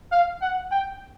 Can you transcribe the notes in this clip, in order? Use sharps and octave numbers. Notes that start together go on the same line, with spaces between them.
F5
F#5
G5